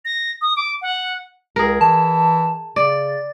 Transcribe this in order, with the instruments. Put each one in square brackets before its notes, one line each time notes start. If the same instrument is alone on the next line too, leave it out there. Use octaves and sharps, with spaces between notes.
[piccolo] A#6
D#6
D6
F#5
[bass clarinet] C#2 [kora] G#4 A#4
[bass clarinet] E3 [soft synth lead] A5
[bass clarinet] C#3 [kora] D5 [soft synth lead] A6